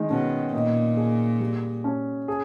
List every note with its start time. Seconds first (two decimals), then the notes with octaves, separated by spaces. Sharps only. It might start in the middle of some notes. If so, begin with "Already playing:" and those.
Already playing: D#3 G#3
0.10 B2 C#4
0.53 A#2 D#4
0.97 G#4
1.40 G3
1.84 C#4
2.28 G#4